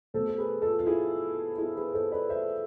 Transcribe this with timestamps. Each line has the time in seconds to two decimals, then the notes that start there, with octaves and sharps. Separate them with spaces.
0.14 B2 A3 A4 C5
0.28 A4
0.38 G#4 B4
0.62 F4 A4
0.79 F4
0.86 E4 G#4
1.58 E4 G#4
1.76 G#4 B4
1.94 A4 C5
2.12 B4 D5
2.29 C5 E5